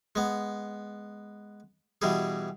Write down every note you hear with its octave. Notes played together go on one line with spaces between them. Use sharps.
G#3 B3
B2 E3 G3 G#4